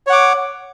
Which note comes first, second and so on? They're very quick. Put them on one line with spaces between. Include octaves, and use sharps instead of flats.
C#5 F#5 D6